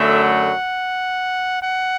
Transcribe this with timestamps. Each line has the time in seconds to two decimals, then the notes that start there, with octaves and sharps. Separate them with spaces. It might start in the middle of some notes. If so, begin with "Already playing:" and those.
Already playing: F#2 D3 F#3 A3 E5
0.24 F#5
1.62 F#5